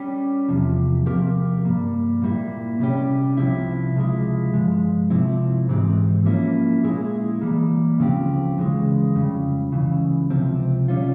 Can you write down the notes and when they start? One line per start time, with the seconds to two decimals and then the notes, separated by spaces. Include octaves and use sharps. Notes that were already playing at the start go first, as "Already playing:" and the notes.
Already playing: G3 C#4 G4
0.49 E2 C3 F3
1.06 C3 F3 C4 G4 A#4
1.65 G2 G3 A#3
2.22 A#2 G3 A#3 E4
2.79 C3 G3 C#4 G4
3.37 C2 C3 F3 C4 E4
3.95 C#2 C3 F3 G#3 E4
4.54 G2 F3 G#3
5.10 C3 F3 C4 E4
5.69 G#2 E3 G#3 C4 G4
6.26 F3 A#3 C#4 E4
6.83 A#2 G#3 E4 G#4
7.41 E3 G3 A#3
7.99 C#2 C#3 F3 C4 G4
8.58 C#2 C#3 E3 G#3
9.15 F2 C#3 G3
9.72 C#2 C#3 E3
10.30 C#2 C3 F3 C4
10.88 C3 G3 C#4 F4